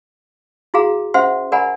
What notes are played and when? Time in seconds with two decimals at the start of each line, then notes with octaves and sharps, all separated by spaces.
0.74 E4 F#4 G#4 F5 A#5
1.14 C#4 C5 E5 F#5 C6
1.52 A#4 D5 F#5 G#5 A#5 B5